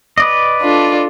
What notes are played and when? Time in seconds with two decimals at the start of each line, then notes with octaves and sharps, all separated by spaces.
0.18 B4 D5 D#5
0.61 D4 F4 A4